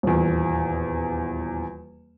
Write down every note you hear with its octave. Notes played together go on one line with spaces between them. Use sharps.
D#1 E2